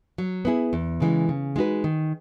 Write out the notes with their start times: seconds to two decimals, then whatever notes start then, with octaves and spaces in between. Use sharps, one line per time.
0.18 F#3
0.45 B3 E4 G#4
0.73 E2
1.00 C#3 E3 G#3
1.29 C#3
1.56 G#3 D#4 F#4 B4
1.84 D#3